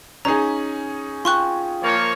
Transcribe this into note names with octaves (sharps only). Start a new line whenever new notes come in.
C#4 D#4 G#4 A#5
F4 G5 C6 C#6 F#6
F3 A#3 C#5